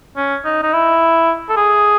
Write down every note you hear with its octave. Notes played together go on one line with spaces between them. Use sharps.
C#4
D#4
D#4
E4
A4
G#4